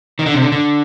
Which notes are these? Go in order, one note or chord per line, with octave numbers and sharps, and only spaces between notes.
D#3
D3
C3
D3
D3